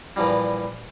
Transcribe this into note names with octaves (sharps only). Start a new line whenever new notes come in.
A#2 E3 F3 G3